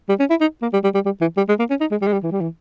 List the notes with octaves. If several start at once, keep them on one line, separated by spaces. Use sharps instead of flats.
G3
C#4
E4
D#4
A#3
G3
G3
G3
G3
E3
G3
G#3
A#3
C#4
D#4
G#3
G3
G#3
G3
E3
G3
E3